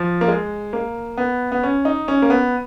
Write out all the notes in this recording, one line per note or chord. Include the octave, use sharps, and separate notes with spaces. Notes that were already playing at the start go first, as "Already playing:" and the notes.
Already playing: F3
A#3
G#3
A#3
B3
B3
C#4
D#4
C#4
A#3
B3